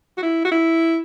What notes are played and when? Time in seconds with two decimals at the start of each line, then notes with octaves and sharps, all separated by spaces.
0.18 F#4
0.22 E4
0.45 F#4
0.52 E4